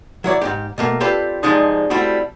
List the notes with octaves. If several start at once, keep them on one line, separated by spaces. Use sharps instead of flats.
F#3 E4 C#5 D5
G#2 C3 G4
B2 A3 A#3
C4 F4 G4 A4 B4 D5
C2 A2 F3 G#3 D4 D#4
G3 A3 C4 E4 F#4